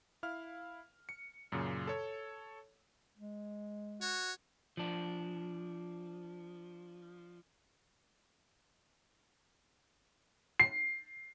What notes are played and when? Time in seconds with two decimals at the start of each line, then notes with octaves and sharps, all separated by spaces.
0.23 E4 F5 F6
1.09 C#7
1.52 F#2 A#2 C#3
1.87 A4 C#5
3.17 G#3
4.01 F#4 C#5
4.77 F3 D4
10.60 C7